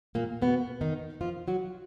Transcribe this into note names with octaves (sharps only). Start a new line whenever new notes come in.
A#2 A#3
B2 B3
D#3 D#4
F3 F4
F#3 F#4